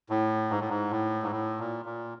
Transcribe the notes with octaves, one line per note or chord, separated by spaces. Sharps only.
A2
G#2
A2
G#2
A2
G#2
A2
A#2
A#2